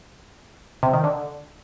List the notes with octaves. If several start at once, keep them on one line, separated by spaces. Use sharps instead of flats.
C3
D#3
D3